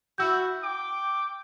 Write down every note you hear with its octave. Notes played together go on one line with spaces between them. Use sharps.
E4 F#4 E6 G6
G5 D6